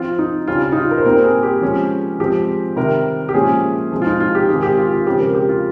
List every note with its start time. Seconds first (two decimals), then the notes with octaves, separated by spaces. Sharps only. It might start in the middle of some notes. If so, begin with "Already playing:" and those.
Already playing: F3 C4 F4
0.19 D#4
0.47 C#3 G3 C#4 F4
0.63 F4
0.72 D#4
0.77 F4
0.91 A#4
0.98 C5
1.05 A#2 G3 C4 A#4
1.23 G#4
1.43 G4
1.62 F3 G#3 C#4
2.20 F3 G#3 C4 G4
2.76 C3 D#3 G3 A#4
3.29 G4
3.34 A#2 F3 G#3 C#4 G#4
3.92 F3 G#3 C4
4.02 F4
4.06 D#4
4.20 F4
4.35 G4
4.48 D#3 G#3 C4 G#4
4.63 G4
4.78 F4
4.92 F4
5.06 C#3 F3 G#3 C4 G4
5.20 A#4
5.34 G4
5.49 F4